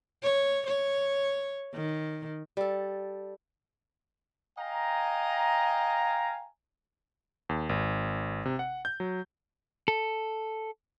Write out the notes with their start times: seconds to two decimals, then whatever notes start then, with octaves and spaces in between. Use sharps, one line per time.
0.23 C#5
0.67 C#5
1.75 D#3
2.57 G3 A4
4.58 D#5 F5 G5 G#5 A#5
7.49 D#2
7.69 G#1
8.45 C3
8.59 F#5
8.85 G6
9.00 F#3
9.88 A4